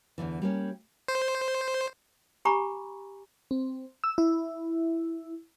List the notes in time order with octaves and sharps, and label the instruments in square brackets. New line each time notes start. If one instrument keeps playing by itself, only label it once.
[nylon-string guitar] E2 G2 D3 E3
G3 A#3 C#4
[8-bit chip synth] C5
[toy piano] G4 G#5 A#5 B5 C#6 D6
[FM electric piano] C4
E6
E4